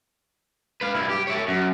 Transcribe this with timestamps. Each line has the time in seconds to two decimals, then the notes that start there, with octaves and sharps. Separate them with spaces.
0.81 B4 F5
0.95 G2 E4
1.10 G4
1.27 C#5 E5
1.48 F#2